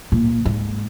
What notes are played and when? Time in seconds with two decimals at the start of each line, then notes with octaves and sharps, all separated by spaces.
0.12 A#2
0.45 G#2